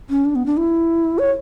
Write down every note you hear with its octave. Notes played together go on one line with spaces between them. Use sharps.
C#4
D4
B3
D4
E4
C#5